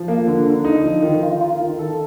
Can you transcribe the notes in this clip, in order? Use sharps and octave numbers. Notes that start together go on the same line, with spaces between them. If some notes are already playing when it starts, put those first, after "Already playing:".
Already playing: F3
A#3
D3
D3
D#4
F3
D#3
F4
F4
D#3
D#3 A4